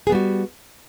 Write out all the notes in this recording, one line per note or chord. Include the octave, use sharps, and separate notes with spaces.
G3 B3 F#4 G#4